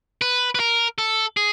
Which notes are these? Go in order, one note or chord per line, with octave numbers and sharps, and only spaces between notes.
B4
B4
A#4
A4
G#4